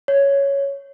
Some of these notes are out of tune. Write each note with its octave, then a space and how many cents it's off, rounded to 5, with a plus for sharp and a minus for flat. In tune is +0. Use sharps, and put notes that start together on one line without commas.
C#5 +5